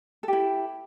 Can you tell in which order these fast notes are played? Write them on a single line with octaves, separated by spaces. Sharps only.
A4 G4 E4